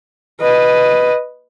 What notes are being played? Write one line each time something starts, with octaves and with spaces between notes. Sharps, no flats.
B4 D#5